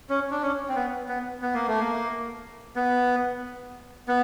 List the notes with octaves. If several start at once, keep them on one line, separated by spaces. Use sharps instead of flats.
C#4
D4
C#4
C4
B3
B3
B3
A#3
A3
A#3
B3
B3